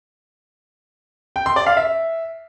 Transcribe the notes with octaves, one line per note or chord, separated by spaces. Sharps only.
G5
C6
D5
F5
E5